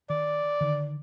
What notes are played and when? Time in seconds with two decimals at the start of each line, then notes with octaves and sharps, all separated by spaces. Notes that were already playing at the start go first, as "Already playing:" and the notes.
0.10 D#3 D5
0.61 D3 D#3